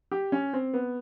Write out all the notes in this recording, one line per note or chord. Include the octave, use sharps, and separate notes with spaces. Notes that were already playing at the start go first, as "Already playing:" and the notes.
G4
C#4
C4
B3